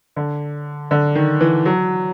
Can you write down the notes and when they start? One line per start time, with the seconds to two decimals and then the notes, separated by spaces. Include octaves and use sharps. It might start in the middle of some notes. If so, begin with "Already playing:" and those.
0.16 D3
0.91 D3
1.15 D#3
1.41 E3
1.65 F#3